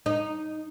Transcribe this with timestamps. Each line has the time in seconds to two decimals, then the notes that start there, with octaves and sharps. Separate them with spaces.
0.06 D#4